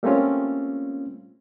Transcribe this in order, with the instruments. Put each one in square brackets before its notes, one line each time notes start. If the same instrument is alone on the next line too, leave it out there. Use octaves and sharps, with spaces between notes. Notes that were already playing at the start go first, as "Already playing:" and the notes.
[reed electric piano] G3 A3 A#3 C4 C#4 F4